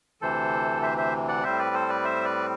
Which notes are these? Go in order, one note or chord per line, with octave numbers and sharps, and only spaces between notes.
D2 C3 E3 A4 C5
C5 E5
C5 E5
D5 F#5
A2 G3 C4 C5 E5
B4 D5
A4 C5
B4 D5
C5 E5
B4 D5